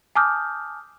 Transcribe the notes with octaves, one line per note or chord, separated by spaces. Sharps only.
G#5 A5 D6 D#6 F6 G6